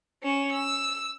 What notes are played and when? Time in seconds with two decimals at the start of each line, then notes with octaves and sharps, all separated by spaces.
0.23 C#4 E7
0.53 E6